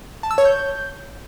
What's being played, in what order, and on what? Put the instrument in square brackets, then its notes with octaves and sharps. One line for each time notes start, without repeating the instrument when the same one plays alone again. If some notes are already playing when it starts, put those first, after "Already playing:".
[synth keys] A5
E6
C#5
G6